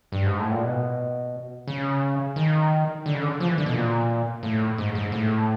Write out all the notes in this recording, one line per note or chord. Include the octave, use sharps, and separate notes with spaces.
G2
G#2
A2
A#2
B2
C#3
D#3
D3
C#3
D3
F3
E3
D3
B2
A#2
A2
G#2
G#2
A2